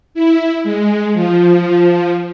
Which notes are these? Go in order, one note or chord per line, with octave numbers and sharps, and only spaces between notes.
E4
G#3
F3